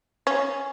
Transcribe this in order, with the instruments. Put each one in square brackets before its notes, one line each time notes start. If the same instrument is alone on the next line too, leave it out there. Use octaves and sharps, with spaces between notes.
[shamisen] C#4